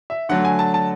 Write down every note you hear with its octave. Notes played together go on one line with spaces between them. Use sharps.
E5
D3 F#3 A3 F#5
G#5
A5
A5